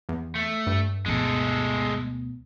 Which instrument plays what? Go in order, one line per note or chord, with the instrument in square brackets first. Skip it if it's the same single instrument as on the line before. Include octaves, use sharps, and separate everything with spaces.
[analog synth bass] E2
[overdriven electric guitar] A3
[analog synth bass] G2
[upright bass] D2 B2 [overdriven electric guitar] G#3 A4